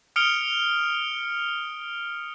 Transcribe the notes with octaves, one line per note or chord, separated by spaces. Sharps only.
D#6 F6 C#7 D7 F7 G7